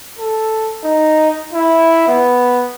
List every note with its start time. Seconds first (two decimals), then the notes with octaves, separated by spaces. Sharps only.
0.19 A4
0.84 D#4
1.53 E4
2.08 B3